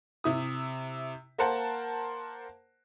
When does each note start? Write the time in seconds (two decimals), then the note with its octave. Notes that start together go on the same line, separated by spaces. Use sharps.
0.24 C3 E4 D#6
1.38 A#3 A#4 C5 F#5 A5